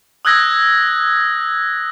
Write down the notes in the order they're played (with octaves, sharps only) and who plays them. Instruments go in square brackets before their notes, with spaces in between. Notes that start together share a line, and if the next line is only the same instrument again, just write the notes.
[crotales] D#6 E6 F#6 G#6 A#6